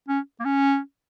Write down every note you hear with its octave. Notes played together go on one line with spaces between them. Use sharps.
C#4
A#3
C#4